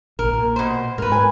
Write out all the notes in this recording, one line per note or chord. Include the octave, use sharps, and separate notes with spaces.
A#1 A#4
A#2
B2 C5
G#2 A#4 B4
G#5